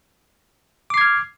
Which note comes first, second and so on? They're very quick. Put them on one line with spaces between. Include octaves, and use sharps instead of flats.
D6 C7 G#6 F6